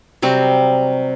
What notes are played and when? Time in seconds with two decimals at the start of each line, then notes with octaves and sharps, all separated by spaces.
0.22 C3 F#3 G3 C4